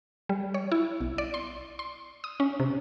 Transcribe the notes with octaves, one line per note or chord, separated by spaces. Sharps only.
G3
C#5
E4
B1
D5
C6
C6
D#6
C#4
C3